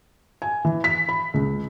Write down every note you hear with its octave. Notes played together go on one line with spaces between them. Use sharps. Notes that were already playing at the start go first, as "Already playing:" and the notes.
G#5
E3
B6
B5
C#2